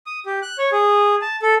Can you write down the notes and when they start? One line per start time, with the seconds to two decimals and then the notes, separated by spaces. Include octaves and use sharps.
0.06 D#6
0.26 G4
0.42 F#6
0.58 C#5
0.72 G#4
1.22 A5
1.42 A4